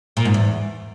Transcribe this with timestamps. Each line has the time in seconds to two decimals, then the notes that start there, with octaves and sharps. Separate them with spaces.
0.17 A#2
0.25 G#2
0.34 E2